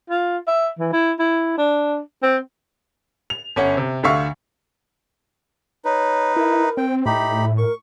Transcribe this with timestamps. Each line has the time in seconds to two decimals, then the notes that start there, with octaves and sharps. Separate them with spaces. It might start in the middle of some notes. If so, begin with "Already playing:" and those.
0.09 F4
0.47 E5
0.79 E3
0.92 E4
1.19 E4
1.58 D4
2.23 C4
3.30 F7
3.56 G1 C#4 F#5
3.77 C3
4.03 D2 D3 E5 F5 C#6
5.85 D#4 B4 C#5
6.36 E4 A#4
6.77 C4 G5
7.06 A2 D#4 G4 E5 B5
7.58 A#4 C#6